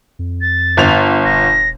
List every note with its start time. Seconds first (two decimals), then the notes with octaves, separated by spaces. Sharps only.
0.19 F2
0.41 A6
0.77 G1 F7
1.25 D#1 A#6